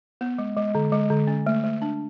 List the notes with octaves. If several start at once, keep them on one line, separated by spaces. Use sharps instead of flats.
B3
G#3
G#3
D3
G#3
D3
C#4
A3
A3
D4